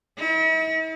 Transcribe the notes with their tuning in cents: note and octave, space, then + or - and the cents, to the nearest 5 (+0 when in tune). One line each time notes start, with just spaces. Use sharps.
E4 -45